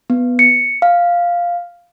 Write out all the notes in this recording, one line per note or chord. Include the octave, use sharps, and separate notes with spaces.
B3
C#7
F5